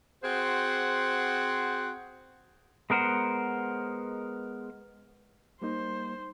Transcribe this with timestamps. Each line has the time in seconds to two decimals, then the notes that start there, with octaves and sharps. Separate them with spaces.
0.23 C4 F#4 G#4 C5 F#5
2.90 G#3 B3 A#4 C5 F#5
5.62 G3 A#3 D#4 C5